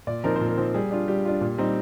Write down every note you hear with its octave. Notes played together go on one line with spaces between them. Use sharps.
A#2 D5
F3 C4 D#4 A#4
C5
A#2
A#4
F3 C4 D#4
G3 G#4
D4 F4
G3 G4
D4 F4
A#2
G3 C4 D#4